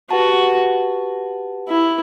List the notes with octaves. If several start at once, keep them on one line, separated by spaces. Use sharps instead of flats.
F#4 G4 B4 F#5 A5
E4